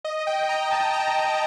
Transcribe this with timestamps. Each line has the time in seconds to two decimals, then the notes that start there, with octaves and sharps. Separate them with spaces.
0.05 D#5
0.27 G5
0.49 A#5
0.71 A5
0.93 A#5
1.15 A5